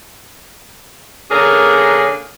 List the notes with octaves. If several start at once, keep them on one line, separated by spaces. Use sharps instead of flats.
D3 A#3 C#4 D4 G#4 A#4